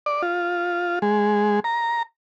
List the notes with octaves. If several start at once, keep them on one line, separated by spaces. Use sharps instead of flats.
D5
F4
G#3
A#5